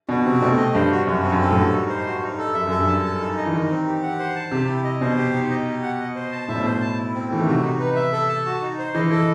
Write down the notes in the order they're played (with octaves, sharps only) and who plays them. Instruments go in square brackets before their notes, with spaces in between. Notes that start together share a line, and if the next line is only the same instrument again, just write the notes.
[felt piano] B2 [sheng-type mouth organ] F#4
[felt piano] C3 [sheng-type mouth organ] C4
[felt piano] B2 [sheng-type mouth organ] A3
[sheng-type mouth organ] D#5
[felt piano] G2 [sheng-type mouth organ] C5
[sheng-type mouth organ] F#4
[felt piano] F#2 [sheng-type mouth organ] F#4
[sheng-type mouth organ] C4
[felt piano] F#2
[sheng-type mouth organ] A4
[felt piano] A2
[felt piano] G2 [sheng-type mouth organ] F#4
[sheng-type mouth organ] D#4
C5
F#4
D#4
A4
[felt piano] F#2 [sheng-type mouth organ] E5
[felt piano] F#2 [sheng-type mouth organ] A4
[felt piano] G2
[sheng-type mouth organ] A5
A4
D#4
D#5
[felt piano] E3
[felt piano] D#3 [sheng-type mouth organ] D#4
[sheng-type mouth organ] C4
G4
F#5
C5
A5
[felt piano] C3 [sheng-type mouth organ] G4
[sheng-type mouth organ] E4
D#5
[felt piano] B2 [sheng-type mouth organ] C5
[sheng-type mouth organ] G4
D#4
D#5
G4
F#5
D#5
C5
A5
[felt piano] A2 [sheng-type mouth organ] E5
[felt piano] B2
[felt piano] A2 [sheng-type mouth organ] C5
[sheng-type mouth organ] A5
E4
C4
[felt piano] E3 [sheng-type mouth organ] A3
[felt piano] D#3
[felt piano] C3 [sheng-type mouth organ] F#4
[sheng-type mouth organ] D#4
B4
E5
A4
A5
F#4
D#4
C5
[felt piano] E3 [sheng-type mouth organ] D#5
[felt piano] E3 [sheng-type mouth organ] A4